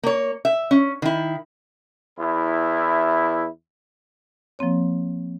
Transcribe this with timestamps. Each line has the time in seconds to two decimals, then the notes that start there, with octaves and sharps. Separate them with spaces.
0.03 A#3 C#5
0.45 E5
0.71 C#4
1.02 D#3 E4
2.19 E2 E4
4.59 F3 A#3 C4 C#5